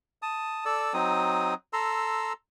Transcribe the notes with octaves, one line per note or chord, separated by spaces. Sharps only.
A5 D#6
A4 D5 E6
F#3 C4 D#4 D#6
A4 A#5 C6 E6